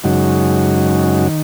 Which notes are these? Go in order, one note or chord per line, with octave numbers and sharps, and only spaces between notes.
F#2 C#3 G#3 D#4 F#4
D#3